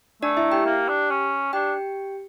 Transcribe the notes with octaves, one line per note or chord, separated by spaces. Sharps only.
A3 D4 D5
E4 E5
G4 G5
A#3
D4
C#4
D4 G4 G5